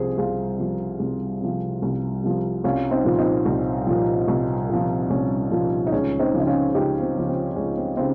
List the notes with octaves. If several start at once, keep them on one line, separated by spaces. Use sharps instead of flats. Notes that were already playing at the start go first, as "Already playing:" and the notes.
Already playing: C2 C3 F3 G#4 C5
C2 F4 G#4
C3 F3
C2
C3 F3
C2
C3 F3
C2 C#4 F4
C4 D#4
A#2 F3
C4 D#4
C2
A#2 F3
C2
A#2 F3
C2 C#4
A#2 F3
D#4
C#2 C#4
C4 D#4
C#3 F3
D#4
C#4 F4
C#2 D#4 G4
C4
C#3 F3
C4
C#2 C#4
C4
C#3 C4 D#4